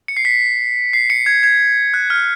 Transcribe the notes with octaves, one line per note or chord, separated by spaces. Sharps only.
C#7
C7
B6
C7
C#7
G#6
G#6
F#6
F6